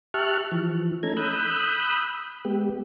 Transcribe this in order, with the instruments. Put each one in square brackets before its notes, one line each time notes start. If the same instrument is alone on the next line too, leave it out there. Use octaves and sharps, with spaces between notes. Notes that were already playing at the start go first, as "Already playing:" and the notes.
[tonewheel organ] G4 E5 A5 C#6 F6 F#6
E3 F3
A3 C#4 D#4 A4 A#5 G#6
B5 D#6 E6 F#6 G6
G#3 B3 G4